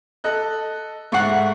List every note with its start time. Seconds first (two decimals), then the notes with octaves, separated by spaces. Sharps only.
0.24 A4 D#5 F#6
1.12 G#2 A3 F#5 C#6 C7